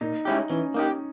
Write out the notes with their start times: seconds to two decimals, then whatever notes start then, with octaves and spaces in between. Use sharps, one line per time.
0.01 A#2 D#4
0.25 G#3 C#4 E4 G4
0.50 E3 C#4
0.74 A#3 D#4 G4